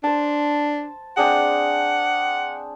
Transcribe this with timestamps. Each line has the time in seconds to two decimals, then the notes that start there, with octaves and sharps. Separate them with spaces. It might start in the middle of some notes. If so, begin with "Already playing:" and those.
0.04 D4 C5 A5
1.17 C4 D4 G#4 F#5